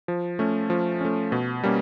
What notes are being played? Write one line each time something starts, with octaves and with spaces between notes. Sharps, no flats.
F3
A3 C#4
F3
A3 C#4
B2
G3 A#3 C#4